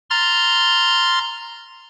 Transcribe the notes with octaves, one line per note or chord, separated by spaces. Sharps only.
A#5 C6 F6 A6